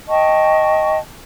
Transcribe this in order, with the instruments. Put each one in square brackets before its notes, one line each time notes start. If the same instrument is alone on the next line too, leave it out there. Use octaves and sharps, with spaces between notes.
[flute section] D#5 G5 A5 C#6